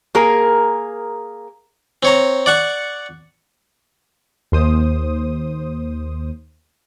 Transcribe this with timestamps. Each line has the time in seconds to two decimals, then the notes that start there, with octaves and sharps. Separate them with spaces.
0.15 A#3 G#4 A#4
2.03 C4 C#5 A#5
2.46 D5 F#5 C#6
4.52 D#2 C5 D#6